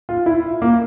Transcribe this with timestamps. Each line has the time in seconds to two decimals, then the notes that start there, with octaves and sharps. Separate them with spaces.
0.09 F4
0.26 E4
0.62 A#3